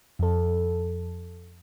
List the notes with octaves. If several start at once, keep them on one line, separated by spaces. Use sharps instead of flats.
F2 A4